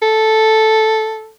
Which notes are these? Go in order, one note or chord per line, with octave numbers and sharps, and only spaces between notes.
A4